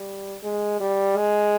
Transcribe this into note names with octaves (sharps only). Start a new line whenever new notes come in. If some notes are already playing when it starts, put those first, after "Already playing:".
Already playing: G3
G#3
G3
G#3